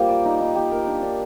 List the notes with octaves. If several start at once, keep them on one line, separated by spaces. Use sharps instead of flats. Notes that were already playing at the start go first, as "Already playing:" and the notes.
Already playing: G3 A#3 F4 G4 C5
D5
D#4
D#4
G4
A#4
D4
D4